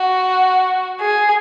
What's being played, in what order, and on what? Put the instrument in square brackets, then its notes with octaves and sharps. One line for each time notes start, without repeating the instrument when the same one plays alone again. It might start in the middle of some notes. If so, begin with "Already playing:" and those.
Already playing: [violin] F#4
G#4